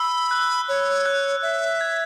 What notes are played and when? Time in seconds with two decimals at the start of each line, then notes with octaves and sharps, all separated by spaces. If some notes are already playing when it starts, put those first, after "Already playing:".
Already playing: B5 E6
0.31 F#6
0.68 C#5
1.06 F#6
1.42 E5
1.81 G#6